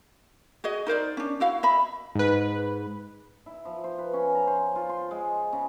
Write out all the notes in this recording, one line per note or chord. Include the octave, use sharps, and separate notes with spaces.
F#4 G#4 D#5
D#4 A#4 C5 D5
C#4 D4
E4 F#4 F5
D#5 E5 B5
G#2 B4
E4
F3
C5
B4
C#4
A#5
C5
F4
C6
G#3
C#3